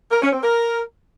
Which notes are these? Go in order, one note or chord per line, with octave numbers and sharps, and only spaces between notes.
A#4
C#4
C4
A#4